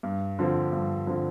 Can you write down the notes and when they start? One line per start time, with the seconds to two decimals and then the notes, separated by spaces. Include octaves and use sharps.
0.03 G2
0.39 D3 F3 C4
0.73 G2
1.07 D3 F3 C4